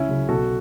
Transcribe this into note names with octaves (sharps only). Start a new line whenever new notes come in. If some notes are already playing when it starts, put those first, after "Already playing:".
Already playing: C#2 C#4 E4
C#3 F#3
B1 F#4 A4